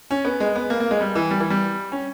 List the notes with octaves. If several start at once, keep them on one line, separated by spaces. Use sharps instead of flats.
C#4
B3
G#3
B3
A#3
A#3
G#3
G3
E3
G3
E3
G3
C#4